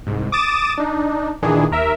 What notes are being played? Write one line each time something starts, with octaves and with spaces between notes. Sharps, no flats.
C2 G#2
D6 D#6 A6 E7
D4 D#4
A#2 D#3 E3 D4 G#4
D#2 A#4 E5